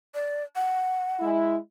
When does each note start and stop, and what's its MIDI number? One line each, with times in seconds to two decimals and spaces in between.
0.15 0.43 74
0.56 1.24 78
1.20 1.56 56
1.20 1.56 64